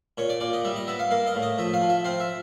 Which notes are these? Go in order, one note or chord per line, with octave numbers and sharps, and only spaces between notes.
A#2 C#5
D5
A#2 D5
D#5
G3 E5
D#5
B3 E5
F5
A#3 F5
D#5
A2
D#5
F3 E5
F5
F3
E5
C4 F5
E5